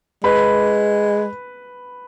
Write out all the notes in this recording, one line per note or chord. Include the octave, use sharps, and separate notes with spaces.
G#3 B4 B5